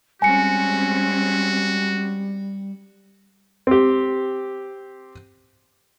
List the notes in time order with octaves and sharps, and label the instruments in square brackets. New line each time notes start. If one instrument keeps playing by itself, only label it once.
[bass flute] G3 [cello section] G#3 C4 C#4 [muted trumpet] F#4 [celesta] G#5 C#7
[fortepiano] C4 G4